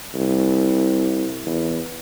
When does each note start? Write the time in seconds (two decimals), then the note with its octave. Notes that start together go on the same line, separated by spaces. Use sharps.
0.14 C2
1.46 E2